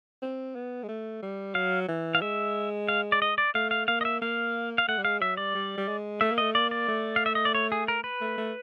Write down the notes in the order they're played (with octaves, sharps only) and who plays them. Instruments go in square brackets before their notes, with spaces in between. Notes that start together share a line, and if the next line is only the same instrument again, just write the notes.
[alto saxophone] C4
B3
G#3
A3
G3
[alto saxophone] F#3 [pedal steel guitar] F5
[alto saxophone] E3
[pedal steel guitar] F5
[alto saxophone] G#3 [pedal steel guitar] E5
[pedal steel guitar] F5
D5
D#5
D5
[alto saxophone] A3 [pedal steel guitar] F5
[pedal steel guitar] F5
[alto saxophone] A#3 [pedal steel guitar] F5
[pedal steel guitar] D#5
E5
[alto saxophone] A#3 [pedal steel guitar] F5
[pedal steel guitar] F5
[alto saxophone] A3 [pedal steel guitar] F#5
[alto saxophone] G3
[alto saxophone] G#3 [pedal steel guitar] F5
[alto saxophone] F#3 [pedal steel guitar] E5
[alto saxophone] G3 [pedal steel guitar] D5
[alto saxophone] G3
G3
G#3
[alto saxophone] A3 [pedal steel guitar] E5
[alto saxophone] A#3
[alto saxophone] A3 [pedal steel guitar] D#5
[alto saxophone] A#3 [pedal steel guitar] D5
[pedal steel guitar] D5
[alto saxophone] A3
[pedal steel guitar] F5
E5
D#5
D5
C#5
G#4
A#4
B4
[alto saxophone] A3
A3